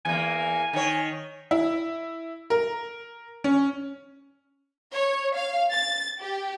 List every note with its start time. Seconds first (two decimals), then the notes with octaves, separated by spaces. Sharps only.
0.05 E2 A#3 G#5
0.73 D#3 C#5
1.51 E4
2.50 A#4
3.44 C#4
4.93 C#5
5.35 F5
5.72 A6
6.21 G4